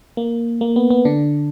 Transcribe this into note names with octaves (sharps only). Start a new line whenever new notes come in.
A#3
A#3
B3
B3
D3 D4